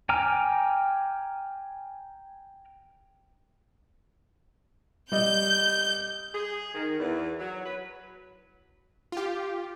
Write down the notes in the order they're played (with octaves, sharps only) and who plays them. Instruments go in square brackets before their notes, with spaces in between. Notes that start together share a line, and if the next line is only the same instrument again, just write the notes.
[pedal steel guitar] G5 G#5 A#5 D6 F6
[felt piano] G3 D#5 [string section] G6
[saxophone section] G#4
D#3
E2
F#3
B4
[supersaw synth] F4 G4